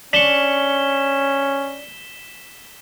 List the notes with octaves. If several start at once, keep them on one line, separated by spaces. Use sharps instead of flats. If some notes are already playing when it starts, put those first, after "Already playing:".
C#4 D4 C#6 B6 E7 G7